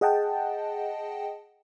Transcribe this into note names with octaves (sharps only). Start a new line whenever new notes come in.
G#4 D#5 F#5 G5 A5